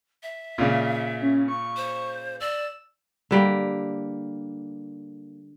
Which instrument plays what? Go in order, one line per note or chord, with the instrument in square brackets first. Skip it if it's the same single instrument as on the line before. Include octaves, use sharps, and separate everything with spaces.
[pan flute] E5
[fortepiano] A#2 C#3
[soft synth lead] C#4
C#6
[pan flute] C5
[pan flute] D5 [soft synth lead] E6
[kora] D3 G3 A#3